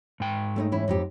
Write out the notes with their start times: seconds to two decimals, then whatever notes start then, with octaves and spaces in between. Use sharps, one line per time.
0.20 G#2 G5
0.56 A3 C#4 D#4
0.72 E3 C#4 E4
0.88 F2 D#4 G4